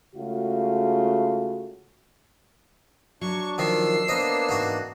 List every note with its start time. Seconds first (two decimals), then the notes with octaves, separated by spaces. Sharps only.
0.15 C#3 G#3 A3 F4 F#4
3.21 F#3 D4 C#6
3.58 D#3 F3 E6 C7
4.08 A#3 B3 D4 C5 D#5
4.49 E2 G#2 D#4 F#4